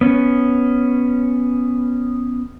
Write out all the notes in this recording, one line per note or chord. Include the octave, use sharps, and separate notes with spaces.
B3 C#4